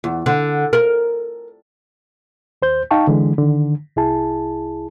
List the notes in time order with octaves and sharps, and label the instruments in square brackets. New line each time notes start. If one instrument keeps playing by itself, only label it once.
[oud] E2
D3
A#4
[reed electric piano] D#2 C5 G6
D#4 F5 G5 A5 C#6
D3 E3 G#3
D3 D#3
C2 E4 G#4 A5